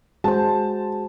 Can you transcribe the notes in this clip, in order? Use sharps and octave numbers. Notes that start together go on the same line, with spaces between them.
G#3 F#4 G#4 C5 A5